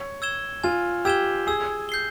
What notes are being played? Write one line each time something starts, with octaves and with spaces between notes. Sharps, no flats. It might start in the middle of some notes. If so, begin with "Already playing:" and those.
Already playing: C#5
E6 G#6 E7 G7
F4 G#5
G4 E6 G#6 E7 G7
G#4 E6
G6 C7 G7